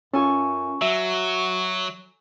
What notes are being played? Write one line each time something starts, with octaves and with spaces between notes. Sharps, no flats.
F#2 C#4 F4 A4 G#5 C#6
F#3 F#4 E5